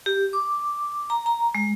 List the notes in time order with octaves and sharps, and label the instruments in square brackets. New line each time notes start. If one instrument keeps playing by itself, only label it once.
[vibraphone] G4
D6
A#5
A#5
G#3